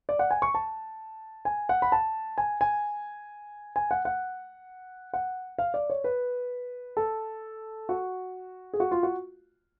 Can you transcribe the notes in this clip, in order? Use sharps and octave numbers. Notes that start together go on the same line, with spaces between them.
D5
F#5
G#5
C#6
A5
G#5
F#5
B5
A5
G#5
G#5
G#5
F#5
F#5
F#5
F5
D5
C#5
B4
A4
F#4
G#4
F#4
F4
F#4